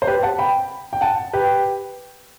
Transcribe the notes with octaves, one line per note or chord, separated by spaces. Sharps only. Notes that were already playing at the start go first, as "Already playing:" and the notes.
C5
G4 B4
F#5 A5
G5 B5
G5
F#5 A5
G4 B4